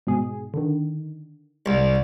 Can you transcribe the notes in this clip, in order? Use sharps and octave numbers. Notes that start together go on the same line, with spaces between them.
G#2 B2 G#4
D3 D#3
C2